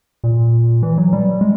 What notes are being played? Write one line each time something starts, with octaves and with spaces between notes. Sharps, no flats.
A#2
E3
F#3
G3
G#3